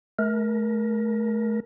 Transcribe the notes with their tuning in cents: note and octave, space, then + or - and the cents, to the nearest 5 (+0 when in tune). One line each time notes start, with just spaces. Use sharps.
A3 -30 A#4 +20